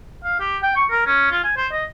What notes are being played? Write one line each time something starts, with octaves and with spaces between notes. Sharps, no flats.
F5
G4
G5
C#6
A#4
C#4
F4
G#5
C5
D#5